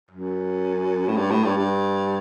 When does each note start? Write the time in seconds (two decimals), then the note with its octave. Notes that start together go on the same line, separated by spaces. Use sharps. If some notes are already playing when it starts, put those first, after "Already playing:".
0.11 F#2
1.08 A2
1.17 G2
1.31 A2
1.44 G2
1.58 G2